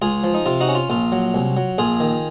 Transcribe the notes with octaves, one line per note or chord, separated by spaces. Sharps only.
C#2 F4 G#4
F3
D#4
C3 F4
D#4 F#4
C#4
F4
A#1 F4
F#3
C2
F#3
A#1 F4 G#4
D#3